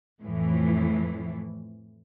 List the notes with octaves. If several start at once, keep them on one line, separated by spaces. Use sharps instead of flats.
F2 A2 E3